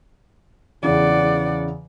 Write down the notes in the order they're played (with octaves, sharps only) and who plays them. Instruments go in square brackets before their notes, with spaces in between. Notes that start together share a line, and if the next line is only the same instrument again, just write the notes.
[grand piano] E2 C#3 E3 [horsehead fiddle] D5 F#5